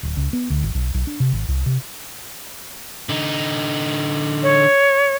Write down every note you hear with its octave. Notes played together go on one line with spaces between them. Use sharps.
D1
C#2
B3
D2
G#1
B1
B1
D4
C3
G#1
C2
C3
D3 D#4
C#5